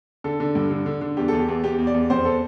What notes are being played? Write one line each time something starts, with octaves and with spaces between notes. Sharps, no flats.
D3 A4
D3
G2
D3
D3
D3
E2 G4
E2 A4
G4
E2
E2 G4
E2
D5
E2
F2 C5
A4